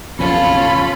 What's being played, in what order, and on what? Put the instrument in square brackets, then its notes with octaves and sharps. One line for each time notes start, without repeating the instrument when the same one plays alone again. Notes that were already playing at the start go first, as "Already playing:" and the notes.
[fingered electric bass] F#1 B1 F2 [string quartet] C#4 F4 A4 [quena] B5